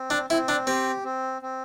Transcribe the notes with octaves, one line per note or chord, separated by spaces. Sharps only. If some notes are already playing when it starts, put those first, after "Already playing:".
Already playing: C4
D4
C4 E4
D4
C4 G4
C4
C4